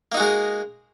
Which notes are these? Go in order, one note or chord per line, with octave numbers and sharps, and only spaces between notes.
G#3 A#3 D#4 F#4 A#4